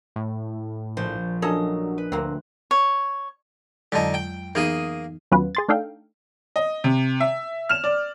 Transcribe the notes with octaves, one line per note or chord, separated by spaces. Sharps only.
A2
A#1 C5
F#3 C#4 D4 A4 A#4 D#5
B4
D2 A#3 C4
C#5
F2 D3 F#3 G#3 D#4
G5
E3 A#3 B3 D#4 G#4 D#6
D#2 F#3 B3 C#4 F4 B4
G#4 C6 A6
A3 D4 D#4 A4 F5 G5
D#5
C3
E5
F6 E7
D5